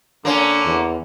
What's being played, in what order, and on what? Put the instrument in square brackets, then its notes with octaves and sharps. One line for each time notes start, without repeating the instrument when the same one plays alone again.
[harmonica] D3 [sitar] A#3 C#4 [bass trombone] D4
[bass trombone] E2